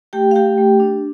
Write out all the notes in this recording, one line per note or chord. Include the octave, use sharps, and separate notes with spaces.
A3 G4 G5
F5
A3 G4 G5
A3
D4